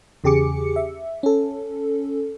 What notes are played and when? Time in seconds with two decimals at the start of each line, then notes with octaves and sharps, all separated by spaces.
0.24 E2 C#3 G4 G#4 D6 C#7
0.76 E5
1.23 C#4 A4